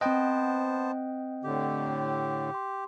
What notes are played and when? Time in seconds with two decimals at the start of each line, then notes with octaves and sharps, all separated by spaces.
0.01 B3 C4 C5 D#5 F#5 G5 A5 F#6
1.44 A2 D3 G4
2.54 C6